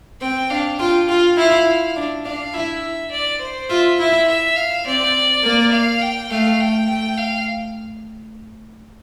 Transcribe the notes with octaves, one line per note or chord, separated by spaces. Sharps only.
C4 G5
D4 F5
F4 G5
F4 F5
E4 F5
D4
D4 F5
E4 E5
D5
C5
F4 E5
E4 E5
E5
F5
C4 D5
A#3
F5
G5
A3 F5
G5
A3 G5
F5